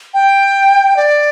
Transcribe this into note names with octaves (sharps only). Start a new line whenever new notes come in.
G5
D5